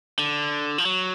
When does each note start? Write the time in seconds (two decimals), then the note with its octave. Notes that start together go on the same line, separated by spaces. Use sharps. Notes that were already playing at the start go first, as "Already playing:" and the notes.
0.19 D3
0.78 F3
0.85 F#3